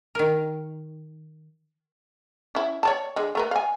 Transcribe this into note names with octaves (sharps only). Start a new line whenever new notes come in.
D#3 A#4
C#4 E4
C#5 D5 A5
D3 G#3
A3 A#4 B4
F5 G#5